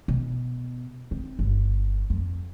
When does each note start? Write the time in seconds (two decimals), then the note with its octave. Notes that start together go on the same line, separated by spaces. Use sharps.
0.08 B2
1.11 C4
1.39 G1
2.10 F2